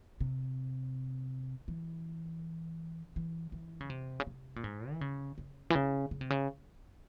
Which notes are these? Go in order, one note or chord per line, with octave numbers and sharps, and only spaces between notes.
C3
E3
E3
E3
C#3
C3
C#3
C3
A#2
G#2
E3
C#3
C#3
E3
C#3
C#3
C3
C#3